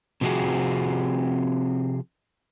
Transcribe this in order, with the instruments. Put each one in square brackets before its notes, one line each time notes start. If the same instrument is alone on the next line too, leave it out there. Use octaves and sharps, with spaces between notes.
[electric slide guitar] C3 F3 C4 C#4 F#4 G#4